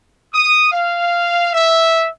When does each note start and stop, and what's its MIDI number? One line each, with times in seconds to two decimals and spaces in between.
0.34 0.68 87
0.72 1.50 77
1.53 2.07 76